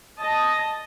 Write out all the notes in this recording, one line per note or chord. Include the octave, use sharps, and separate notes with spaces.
D#5 A5